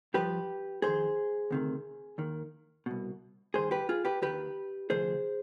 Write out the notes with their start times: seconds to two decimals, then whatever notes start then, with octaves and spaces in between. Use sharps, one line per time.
0.14 G2 F3 G4 B4
0.82 F2 D#3 G#4 C5
1.51 D2 C3 D#3
2.18 D#2 D#3
2.86 C2 B2
3.54 G2 D#3 G#4 C5
3.71 G4 B4
3.89 F4 G#4
4.05 G4 B4
4.22 D#2 D#3 G4 B4
4.90 D2 C3 F3 G#4 C5